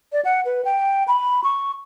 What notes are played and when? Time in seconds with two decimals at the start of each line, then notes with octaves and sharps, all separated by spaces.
0.13 D5
0.25 F#5
0.45 B4
0.65 G5
1.08 B5
1.44 C#6